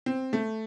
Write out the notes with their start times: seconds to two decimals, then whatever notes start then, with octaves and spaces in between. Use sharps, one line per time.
0.06 C4
0.33 A3